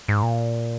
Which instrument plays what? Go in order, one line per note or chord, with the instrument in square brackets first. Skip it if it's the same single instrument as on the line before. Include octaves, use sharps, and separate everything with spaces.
[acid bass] G#2
A#2